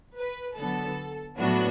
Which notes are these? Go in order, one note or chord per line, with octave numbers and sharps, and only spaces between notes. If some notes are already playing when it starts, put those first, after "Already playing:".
B4
D3 F#3 B3 A4
A2 F#3 B3 D4 F#4